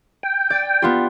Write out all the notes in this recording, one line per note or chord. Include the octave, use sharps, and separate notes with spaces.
G5
D5
B3 F4 G4